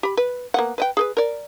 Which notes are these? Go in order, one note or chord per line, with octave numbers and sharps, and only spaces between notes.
G4 B5
B4
A#3 B3 F#5
B4 D#5 G5
G#4 A4 B4
A#4 D5